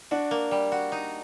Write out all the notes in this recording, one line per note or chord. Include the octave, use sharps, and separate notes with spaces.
D4 F#4
A#3
G3
F#4
D#4